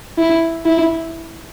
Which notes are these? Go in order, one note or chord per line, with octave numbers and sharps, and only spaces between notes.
E4
E4